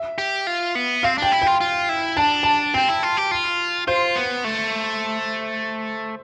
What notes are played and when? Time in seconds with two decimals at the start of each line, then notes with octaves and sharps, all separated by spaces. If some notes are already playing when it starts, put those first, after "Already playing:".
Already playing: E5
0.18 G4
0.47 F4
0.75 B3
1.03 C4 F5
1.18 D4 G5
1.32 E4
1.42 F4 G5
1.61 F4
1.89 E4
2.17 D4 A5
2.43 A5
2.74 C4 G5
2.89 E4
3.03 F4
3.17 G4
3.31 F4
3.88 F4 C5
4.16 B3
4.44 A3